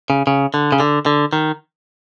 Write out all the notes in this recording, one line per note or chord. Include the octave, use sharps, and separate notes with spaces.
C#3
C#3
D3
C#3
D3
D3
D#3